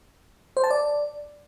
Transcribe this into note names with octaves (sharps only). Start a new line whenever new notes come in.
C5
A5
D5